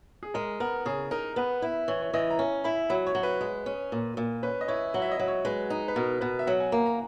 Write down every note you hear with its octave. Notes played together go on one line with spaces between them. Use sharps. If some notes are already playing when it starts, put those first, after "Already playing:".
G#4
G#3 A#4
B3 A#4
C#3 G#4
D#4 A#4
B3 B4
E4
E3 C#5
C#5
E3 D#5
A#5
C#4 G#5
E4 B5
F#3 B5
C#5
F#3
B4
G#3
C#4
A#2
A#2
C#4 B4
D#5
E4 C#5
F#3
E5
D#5
F#3
C#5
G#3 B4
D#4
B4
B2 A#4
B2 B4
E5
F#3 F#5
G#5
A#3 A#5
A#5